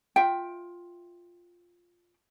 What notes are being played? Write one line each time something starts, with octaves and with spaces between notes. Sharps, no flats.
F4 E5 G5